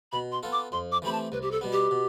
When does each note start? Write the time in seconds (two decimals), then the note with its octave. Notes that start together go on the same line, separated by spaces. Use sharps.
0.12 B2 B5
0.32 C6
0.43 B3 F4 A4
0.52 D6
0.72 F2 C6
0.92 D6
1.02 E3 A3 C4 G4 B5
1.12 A5
1.32 C2 B4
1.42 G4
1.51 A4
1.61 B2 G3 B3
1.72 G4
1.91 B2